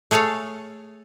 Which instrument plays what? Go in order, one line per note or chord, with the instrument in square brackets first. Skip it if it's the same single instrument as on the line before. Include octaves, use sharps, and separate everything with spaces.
[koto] A3 G#4 A4 C#5 F5